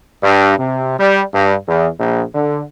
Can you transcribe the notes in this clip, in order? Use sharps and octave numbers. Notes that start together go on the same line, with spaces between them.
G2
C3
G3
G2
E2
A#1
D3